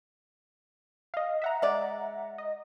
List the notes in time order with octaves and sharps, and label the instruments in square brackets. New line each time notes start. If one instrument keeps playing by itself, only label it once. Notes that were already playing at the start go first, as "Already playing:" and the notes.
[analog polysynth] D#5 F5
E5 F#5 A#5
[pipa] G#3 D5
[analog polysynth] D#5